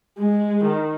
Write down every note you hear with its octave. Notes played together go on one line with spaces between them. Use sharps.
G#3
D#3